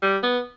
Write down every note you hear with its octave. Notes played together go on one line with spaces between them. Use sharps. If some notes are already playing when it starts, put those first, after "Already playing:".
G3
B3